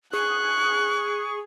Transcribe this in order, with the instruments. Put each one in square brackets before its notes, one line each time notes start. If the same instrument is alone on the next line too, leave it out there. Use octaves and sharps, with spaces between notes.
[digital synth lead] G#4 [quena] C#6 [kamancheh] F#6